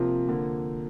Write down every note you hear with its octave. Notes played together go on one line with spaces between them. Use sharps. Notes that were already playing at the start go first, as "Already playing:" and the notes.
Already playing: C3 F3 A#3 F4
D3 F3 A#3